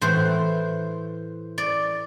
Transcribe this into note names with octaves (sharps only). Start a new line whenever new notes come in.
A2 E3 C5
D5